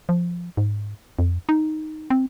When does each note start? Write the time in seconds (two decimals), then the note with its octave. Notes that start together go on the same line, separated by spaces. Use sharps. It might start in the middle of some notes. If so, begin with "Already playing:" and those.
0.09 F3
0.57 G#2
1.19 F2
1.49 D#4
2.10 C4